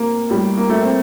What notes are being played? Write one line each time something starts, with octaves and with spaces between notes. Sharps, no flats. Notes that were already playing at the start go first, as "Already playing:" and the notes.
Already playing: C3 A#3
A2 G3
A#3
A3
C4